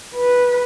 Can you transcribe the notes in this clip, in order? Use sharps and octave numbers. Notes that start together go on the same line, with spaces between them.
B4